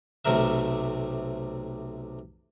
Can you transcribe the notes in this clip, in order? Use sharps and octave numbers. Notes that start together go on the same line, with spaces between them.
B1 C3 A3 A#4 E5